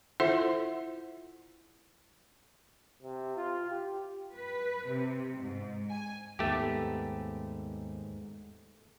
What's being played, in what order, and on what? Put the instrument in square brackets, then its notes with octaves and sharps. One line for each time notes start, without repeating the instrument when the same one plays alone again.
[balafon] E4 F4 A4 C5 E5 F#5
[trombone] C3
F4
G4
[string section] B4
C3
G#2
G#5
[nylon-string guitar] D#2 B3 [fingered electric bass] G#2 [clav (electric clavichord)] A3 G4